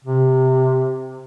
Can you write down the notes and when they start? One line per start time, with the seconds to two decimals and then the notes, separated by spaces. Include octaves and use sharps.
0.05 C3